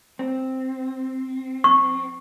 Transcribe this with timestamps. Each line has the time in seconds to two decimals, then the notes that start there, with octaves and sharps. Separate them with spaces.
0.19 C4
1.64 C#6